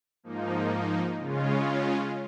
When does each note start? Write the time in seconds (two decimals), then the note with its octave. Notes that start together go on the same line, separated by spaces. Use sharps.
0.23 G#2 F3 A#3 D#4
1.18 C#3 G#3 C#4 F4